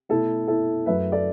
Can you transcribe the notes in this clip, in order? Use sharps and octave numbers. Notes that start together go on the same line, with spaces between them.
B2 A3 E4 A4
E4 A4
F#2 F#3 A3 B4 E5
A4 D5